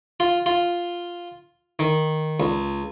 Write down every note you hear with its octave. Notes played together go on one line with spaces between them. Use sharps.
F4
F4
D#3
C#2